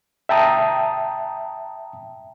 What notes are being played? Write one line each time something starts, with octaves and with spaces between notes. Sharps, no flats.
E5 G5 A5 A#5 D#6